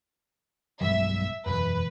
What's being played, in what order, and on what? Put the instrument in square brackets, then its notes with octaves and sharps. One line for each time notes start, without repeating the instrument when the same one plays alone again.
[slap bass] B1 G2 G#3 [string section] E5
[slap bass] E1 F#2 [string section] B4